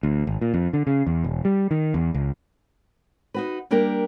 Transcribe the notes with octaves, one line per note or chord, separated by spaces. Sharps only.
D2
G#1
A#2
F2
D3
C#3
E2
E1
G3
D#3
E2
C#2
D#4 F#4 B4
G3 A#3 D4 G4 A#4